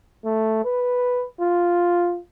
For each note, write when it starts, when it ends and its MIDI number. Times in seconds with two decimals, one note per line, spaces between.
0.25 0.62 57
0.65 1.26 71
1.41 2.18 65